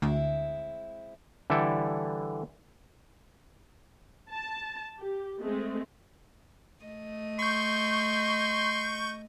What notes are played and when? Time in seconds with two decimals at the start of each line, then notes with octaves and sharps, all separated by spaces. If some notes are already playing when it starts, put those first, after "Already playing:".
0.02 D2 G#3 C4 E4
1.50 D3 E3 G3 E4 A4 G5
4.30 A5
4.99 G4
5.41 G#3 A3 C4
6.84 A3 D#5
7.39 C6 C#6 G6